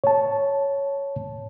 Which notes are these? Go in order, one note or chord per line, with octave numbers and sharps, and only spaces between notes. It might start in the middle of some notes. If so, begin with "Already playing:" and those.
C#5 A5